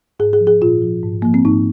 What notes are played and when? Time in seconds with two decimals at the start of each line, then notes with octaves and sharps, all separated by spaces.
0.19 G#2 G#4
0.33 G#4
0.40 F3
0.47 G#4
0.61 A#2 F4
0.82 F3
1.03 G#2
1.22 F3 A#3
1.34 C4
1.45 G#2 D#4